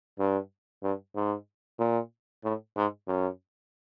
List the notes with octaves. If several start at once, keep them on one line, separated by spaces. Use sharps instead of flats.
G2
G2
G#2
A#2
A2
G#2
F#2